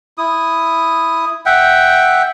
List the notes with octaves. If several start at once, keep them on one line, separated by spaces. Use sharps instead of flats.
E4 D#6
E5 F#5 G5